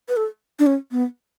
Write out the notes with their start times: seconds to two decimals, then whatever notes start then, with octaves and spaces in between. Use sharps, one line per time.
0.09 B4
0.17 A4
0.59 D4
0.66 C#4
0.92 B3